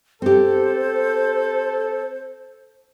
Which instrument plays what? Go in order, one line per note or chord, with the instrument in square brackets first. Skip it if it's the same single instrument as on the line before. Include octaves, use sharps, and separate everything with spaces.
[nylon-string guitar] C4 G4 [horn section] A4 [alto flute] C5